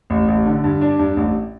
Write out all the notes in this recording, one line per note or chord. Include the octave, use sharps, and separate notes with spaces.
A1
A1
D3
G2
D4
G2
A1